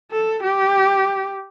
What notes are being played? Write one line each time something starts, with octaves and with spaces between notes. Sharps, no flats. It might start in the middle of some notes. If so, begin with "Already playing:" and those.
A4
G4